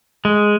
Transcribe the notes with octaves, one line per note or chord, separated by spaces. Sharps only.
G#3